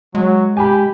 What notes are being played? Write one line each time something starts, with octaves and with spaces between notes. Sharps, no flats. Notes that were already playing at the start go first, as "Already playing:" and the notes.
F#3 G#3
G4 G#5 B5